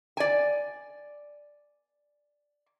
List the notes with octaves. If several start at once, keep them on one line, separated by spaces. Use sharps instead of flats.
D5 G#5